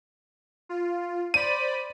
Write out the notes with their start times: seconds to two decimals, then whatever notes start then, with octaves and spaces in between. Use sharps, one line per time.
0.69 F4
1.34 C5 D5 B5 D#7